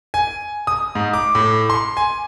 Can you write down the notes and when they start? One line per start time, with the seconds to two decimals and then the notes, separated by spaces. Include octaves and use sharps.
0.14 G#5
0.67 D#6
0.95 G#2
1.14 D6
1.35 A2
1.70 C6
1.97 G#5